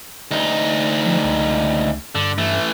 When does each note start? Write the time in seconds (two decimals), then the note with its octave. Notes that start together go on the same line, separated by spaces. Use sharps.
0.31 D2 D#4
1.06 F3
1.24 C#2
2.15 G2 D3
2.38 E3 A3